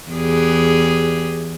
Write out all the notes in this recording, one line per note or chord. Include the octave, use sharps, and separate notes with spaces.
E2 G4 G#4